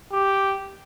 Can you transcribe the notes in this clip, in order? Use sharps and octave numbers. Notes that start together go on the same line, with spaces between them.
G4